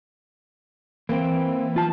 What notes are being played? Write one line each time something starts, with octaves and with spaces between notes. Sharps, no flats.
E3 A#3 C4
F4 A5